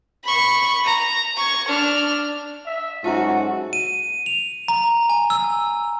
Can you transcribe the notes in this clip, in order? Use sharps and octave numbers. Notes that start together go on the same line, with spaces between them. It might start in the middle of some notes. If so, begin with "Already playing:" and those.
B5 C#6
A#5
C#6 G#6
D4 F6
E5
G#2 F#3 C#4 F4 F#4 A4 E5 A#5
D#7
F7
A#5
G#5
E6